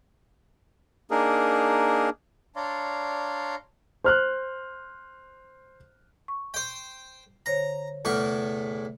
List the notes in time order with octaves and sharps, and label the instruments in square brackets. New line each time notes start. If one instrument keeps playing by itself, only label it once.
[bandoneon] A#3 D4 D#4 G#4 A#4
[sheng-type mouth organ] D4 C#5 D5 F5 A#5 C6
[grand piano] C5 F6 F#6
[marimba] C#6
[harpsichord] C5 G5
[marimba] D3 C5 C#5 [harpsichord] A#5
[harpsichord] E2 A2 C#6 [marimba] C3 F6